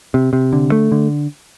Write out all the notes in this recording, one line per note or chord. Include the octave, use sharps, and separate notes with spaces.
C3
C3
D3
A3
D3